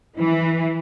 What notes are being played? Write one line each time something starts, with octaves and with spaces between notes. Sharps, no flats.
E3